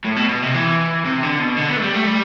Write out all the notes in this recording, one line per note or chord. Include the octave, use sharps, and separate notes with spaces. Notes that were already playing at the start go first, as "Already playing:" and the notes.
A2
B2
B2
C3
E3
C3
D3
B2
D3
B3
A3
G3
A3
G3